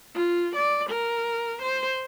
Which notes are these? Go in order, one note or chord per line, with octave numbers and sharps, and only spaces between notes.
F4
D5
A#4
C5